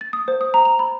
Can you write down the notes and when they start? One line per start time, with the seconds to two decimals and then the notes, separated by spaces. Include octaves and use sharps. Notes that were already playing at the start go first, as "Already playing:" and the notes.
0.01 A6
0.13 D#6
0.28 C5
0.41 D#6
0.54 A#5
0.65 F7
0.79 B5